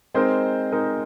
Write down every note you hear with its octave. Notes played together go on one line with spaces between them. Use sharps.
G#3 C4 D#4 A#4 C5
G#3 D#4 A#4